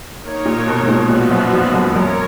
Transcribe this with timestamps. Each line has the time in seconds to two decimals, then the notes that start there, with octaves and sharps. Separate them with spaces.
0.25 A#3 D#4 A#4 C#5
0.45 A#2
0.67 B2
0.83 G#2
0.88 A#2
1.09 A#2 F3 B3 F#4
1.31 F#2
1.53 F2
1.74 F#2
1.95 F#2 A#4 C#5